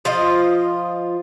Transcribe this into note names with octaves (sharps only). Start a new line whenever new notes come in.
F3 F4 D#5